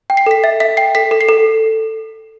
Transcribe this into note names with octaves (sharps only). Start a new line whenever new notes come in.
G5
C7
A4 B6
E5 A6
E5 B6
G5 C7
A4 B6
A4
C7
A4